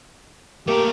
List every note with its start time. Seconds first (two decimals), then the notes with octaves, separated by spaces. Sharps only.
0.67 A3 A#3 G4 A#4